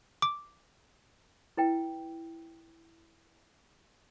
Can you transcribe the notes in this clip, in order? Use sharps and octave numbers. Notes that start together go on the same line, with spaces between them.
D6
E4 B4 G5